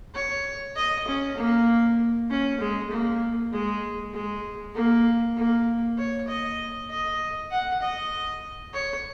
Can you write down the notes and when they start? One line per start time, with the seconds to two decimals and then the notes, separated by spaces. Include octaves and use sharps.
0.15 C#5
0.76 D#5
1.08 C#4
1.37 A#3
2.30 C#4
2.60 G#3
2.91 A#3
3.53 G#3
4.14 G#3
4.75 A#3
5.37 A#3
5.98 C#5
6.28 D#5
6.90 D#5
7.51 F#5
7.82 D#5
8.74 C#5